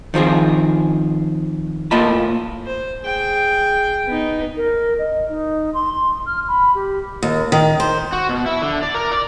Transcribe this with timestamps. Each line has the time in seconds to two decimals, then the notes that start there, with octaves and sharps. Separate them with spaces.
0.14 D#3 F3 C4 G#4
1.91 A2 A#3 F4 D#5 A5 B5
2.66 C5
3.03 G#4 G5
4.07 B3 D#4
4.57 A#4
4.99 D#5
5.29 D#4
5.74 C6
5.93 C6
6.26 F6
6.48 B5
6.75 G4
7.23 D#2
7.52 D#3
7.80 C5
8.13 F#4
8.29 B2
8.46 E4
8.62 D3
8.83 D5
8.94 A#4
9.12 D5